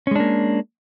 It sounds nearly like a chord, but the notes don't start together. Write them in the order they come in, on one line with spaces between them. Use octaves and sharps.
C#4 G#3 D4 A#3